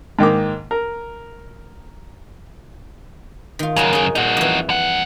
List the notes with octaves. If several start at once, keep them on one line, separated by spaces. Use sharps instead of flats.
G#2 D#3 A#3 D6
A#4
D#3 F4
F#2 C#3 F#4 A#4 C#5
D#4 G#4
A#2 D#4 F#4
F2 E3
G2 F#5